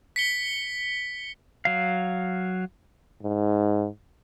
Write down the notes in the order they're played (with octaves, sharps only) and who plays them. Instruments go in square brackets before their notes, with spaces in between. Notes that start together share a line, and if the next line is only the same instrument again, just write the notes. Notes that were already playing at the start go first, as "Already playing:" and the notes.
[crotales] B6 C#7 G7
[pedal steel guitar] F#3 F5
[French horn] G#2